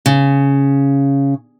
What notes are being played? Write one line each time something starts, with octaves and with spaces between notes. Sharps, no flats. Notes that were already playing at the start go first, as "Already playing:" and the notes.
C#3